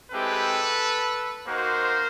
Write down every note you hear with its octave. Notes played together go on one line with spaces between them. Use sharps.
G#3 C4 E4 G4 A4 B4
A#3 D#4 F#4 A#4 C5